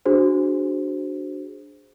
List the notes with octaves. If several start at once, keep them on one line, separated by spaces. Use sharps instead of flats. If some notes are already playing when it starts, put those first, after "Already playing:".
D4 F#4 G#4 C5